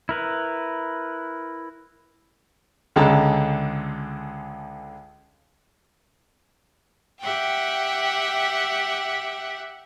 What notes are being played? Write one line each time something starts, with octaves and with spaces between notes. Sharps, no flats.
E4 A#4 B4
C#2 D3 G#3 A4 A#5
G4 E5 F#5 G5